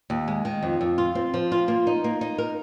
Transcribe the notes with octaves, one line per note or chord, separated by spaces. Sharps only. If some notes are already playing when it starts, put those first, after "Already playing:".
D#2
G#3
D#3
F2
F2
F4
C4
F3
F4
A#3
D#4
A#3
D#4
A#4